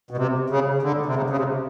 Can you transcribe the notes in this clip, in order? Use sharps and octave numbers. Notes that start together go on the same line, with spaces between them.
B2
C3
C#3
D3
C3
C#3
C#3
C3